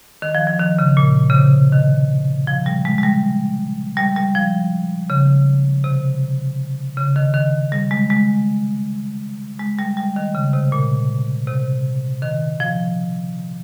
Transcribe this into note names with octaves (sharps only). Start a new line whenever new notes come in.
D#3
F3
F3
D#3
C#3
A#2
C#3
C3
D#3
F3
G3
G#3
G#3
G3
G3
G3
F3
C#3
C3
C#3
D#3
D#3
G3
G#3
G#3
G#3
G3
G3
D#3
C#3
C3
A#2
C3
D#3
F3